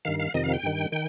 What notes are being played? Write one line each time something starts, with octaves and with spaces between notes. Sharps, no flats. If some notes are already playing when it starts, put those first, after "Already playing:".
G2 D#3 F5
F5
F2 C3 D#3 D#5
F5
G5
G2 D#3
D#3 G5